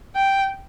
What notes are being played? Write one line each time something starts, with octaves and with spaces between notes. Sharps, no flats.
G5